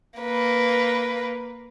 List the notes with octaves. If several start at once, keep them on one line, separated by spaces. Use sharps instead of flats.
A#3 B4